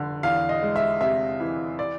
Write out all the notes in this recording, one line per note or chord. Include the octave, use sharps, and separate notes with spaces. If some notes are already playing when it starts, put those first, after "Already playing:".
Already playing: F1 D3
E2 F5
D#5
G#3
E5
C3 E5
E3
D5